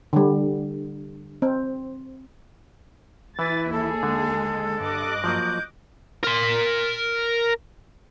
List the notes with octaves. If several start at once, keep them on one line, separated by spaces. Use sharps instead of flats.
D3 G3
C4
E3 E4 B4 A6
D#2 G#4 A4
D3 G#3
G2 D#5 D6 F#6
F3 F#3 A#3 G6
A#4 C6